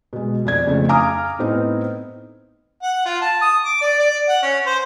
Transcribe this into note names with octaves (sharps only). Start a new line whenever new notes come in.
B2 G#3
F2 D5 G#6
F2 C#3 A3
F5 G#5 A#5 D6 D#6 F6
A2 B3 C4 D#4
F#5
F4
A5
D#6
D6
D5
D5
F#5
C#4
C5